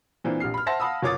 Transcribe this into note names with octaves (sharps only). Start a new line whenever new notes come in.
A#2 E3 A#3 C4 D4
A#1 G4 F6 C7
B5 F6
C5 E5 F#5 A5 C6 A#6
F5 F#5 A5 B5 D#6 E6
F#1 F4 C#5 D6 D#6 A6